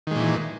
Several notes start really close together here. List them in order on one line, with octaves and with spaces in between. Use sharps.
D#3 G#3 A#2 E3